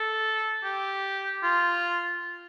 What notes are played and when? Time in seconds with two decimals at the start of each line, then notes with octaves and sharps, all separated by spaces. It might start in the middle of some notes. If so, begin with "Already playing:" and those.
Already playing: A4
0.64 G4
1.43 F4